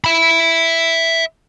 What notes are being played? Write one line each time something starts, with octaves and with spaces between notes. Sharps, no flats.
E5 B5